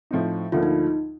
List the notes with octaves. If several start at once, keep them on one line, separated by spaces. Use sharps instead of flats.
A2 F3 C4 D#4
D2 D3 F3 A#3 F4
D#4